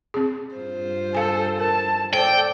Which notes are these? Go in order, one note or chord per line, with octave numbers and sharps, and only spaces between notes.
C4 G#4
G2 F4 C5
A4 F5 G#5
A#4 A5
A4 C5 D5 G5